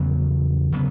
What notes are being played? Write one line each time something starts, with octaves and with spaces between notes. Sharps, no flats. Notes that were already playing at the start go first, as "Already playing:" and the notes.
Already playing: E2 C#3 F#3 B3
C#3 F#3 B3